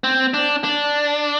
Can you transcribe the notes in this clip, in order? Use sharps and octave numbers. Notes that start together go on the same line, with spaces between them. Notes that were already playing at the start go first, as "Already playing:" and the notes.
C4
D4
D4